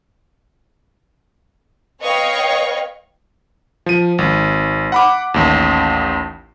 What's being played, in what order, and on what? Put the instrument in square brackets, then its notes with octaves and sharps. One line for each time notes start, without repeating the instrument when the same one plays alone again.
[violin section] B4 C#5 D#5 F5 G5 C#6
[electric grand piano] F3 D#7
G#1
F#5 B5 D6
A1 D#2